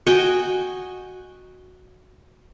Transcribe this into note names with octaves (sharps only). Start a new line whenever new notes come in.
F#4 D#5 G5 G#5